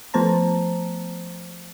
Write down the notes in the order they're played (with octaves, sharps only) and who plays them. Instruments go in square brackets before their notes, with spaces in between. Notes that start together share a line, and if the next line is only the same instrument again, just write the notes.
[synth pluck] F3 A3 B3 C5 A5 A#5